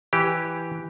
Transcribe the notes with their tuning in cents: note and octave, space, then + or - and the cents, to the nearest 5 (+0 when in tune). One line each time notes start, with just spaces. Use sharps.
E3 +0 G4 +0